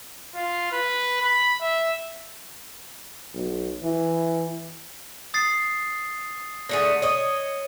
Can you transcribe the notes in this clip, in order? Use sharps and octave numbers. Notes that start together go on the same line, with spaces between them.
F4
B4
B5
E5
B1
E3
D#6 A6 C7
D3 A3 G#4 A#6 C#7 D#7
C#5 D#5